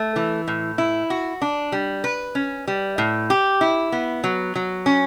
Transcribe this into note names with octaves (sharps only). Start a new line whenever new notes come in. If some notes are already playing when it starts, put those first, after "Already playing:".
Already playing: A3
E3
A2
E4
F#4
D4
G3
B4
C#4
G3
A2
G4
E4
B3
F#3
F#3
C#4